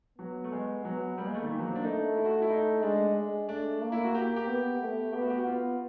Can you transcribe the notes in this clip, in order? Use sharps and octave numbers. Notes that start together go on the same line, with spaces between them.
F#3 B3
A3
G#3
F#3 B3
G3 A#3
G#3
A3
D#3
E3
F#3
C4
D4
A3 D#4
E4
F#4
E4
D#4
G#3 D4
G#3
A3 D4
A#3
E4
F#4
A#3 G4
G4
B3
A3
B3 G4
F#4
G4
F#4
B3 F4